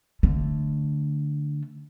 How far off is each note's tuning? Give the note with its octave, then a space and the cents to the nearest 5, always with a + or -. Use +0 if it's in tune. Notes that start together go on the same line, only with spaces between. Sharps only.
D3 +0 A3 +0